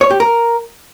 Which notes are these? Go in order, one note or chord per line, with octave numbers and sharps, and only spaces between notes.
C#5
G4
A#4